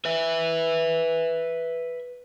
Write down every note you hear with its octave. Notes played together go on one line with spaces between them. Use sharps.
B4 E5